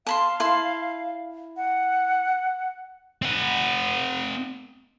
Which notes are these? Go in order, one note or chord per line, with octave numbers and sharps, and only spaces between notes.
F5 A5 B5 C6
E4 A5 C6
F#5
C4 F#5